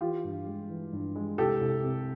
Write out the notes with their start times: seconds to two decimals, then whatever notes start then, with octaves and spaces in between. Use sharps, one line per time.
0.01 E3 F4 G4
0.24 G2
0.47 G#3
0.69 E3
0.93 G2
1.16 G#3
1.38 C2 G4 A4
1.61 C2
1.83 C3